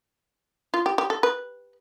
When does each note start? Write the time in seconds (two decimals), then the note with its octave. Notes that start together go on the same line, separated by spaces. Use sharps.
0.74 F4
0.86 G4
0.98 G4
1.10 A4
1.23 B4